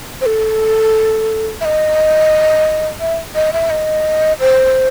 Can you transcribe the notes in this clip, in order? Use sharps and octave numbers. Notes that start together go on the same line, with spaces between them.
C5
A4
E5
D#5
E5
D#5
E5
D#5
C5